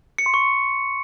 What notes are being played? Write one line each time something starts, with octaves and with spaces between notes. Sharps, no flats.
C#7
C6
C#6